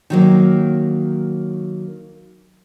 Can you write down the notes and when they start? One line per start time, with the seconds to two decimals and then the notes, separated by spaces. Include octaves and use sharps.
0.10 D#3 F#3 A#3